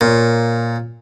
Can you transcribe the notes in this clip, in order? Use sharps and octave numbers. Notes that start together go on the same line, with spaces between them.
A#2 A#3 F4 C#5